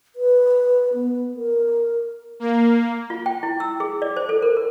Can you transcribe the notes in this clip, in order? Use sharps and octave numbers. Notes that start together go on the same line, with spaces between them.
B4
B3
A#4
A#3
F4
G5
E4
E6
G#4
D5
C5
A4
A#4
A#4